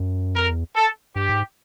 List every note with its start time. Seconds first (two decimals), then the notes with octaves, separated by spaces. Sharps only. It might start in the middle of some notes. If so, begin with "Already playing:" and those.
Already playing: F#2
0.36 F2 A#4
0.50 E2
0.76 A4
1.15 G2 G4
1.29 G#2